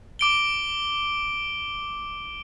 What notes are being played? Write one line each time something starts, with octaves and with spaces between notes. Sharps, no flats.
D6 D7 G7